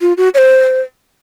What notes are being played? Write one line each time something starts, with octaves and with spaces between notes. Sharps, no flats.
F4
F#4
C#5
C5